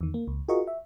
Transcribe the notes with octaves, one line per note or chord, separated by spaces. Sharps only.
E2 D#3
A#3
C#2
F4 F#4 G#4 A#4 D#5 C#6
E5